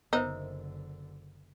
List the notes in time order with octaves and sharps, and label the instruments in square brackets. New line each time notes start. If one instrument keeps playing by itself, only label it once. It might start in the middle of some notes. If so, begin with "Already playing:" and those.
[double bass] F#1 D3 [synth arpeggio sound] B3 [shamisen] D#4 [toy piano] A#4 C5 E5